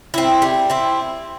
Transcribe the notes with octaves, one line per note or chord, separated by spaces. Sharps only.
C4 E4
G3
C4 E4